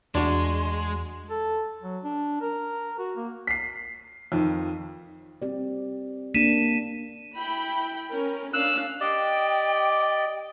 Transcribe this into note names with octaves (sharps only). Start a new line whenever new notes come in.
E2 G#3 D4 F#4
A4
F#3
D4
A#4
F#4
A#3
B6 C7
F2 D#3
C4 G4 D5
A#3 D4 B6 D#7 E7
E4 G5 B5
C#4 A#4
C#4 D4 F5 E6 F#6
G4 D5 D#5 G5